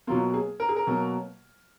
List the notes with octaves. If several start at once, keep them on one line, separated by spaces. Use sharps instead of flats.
B2 F#3 A#3 F4
G#4
A#4
G#4
A#4
B2 F#3 A#3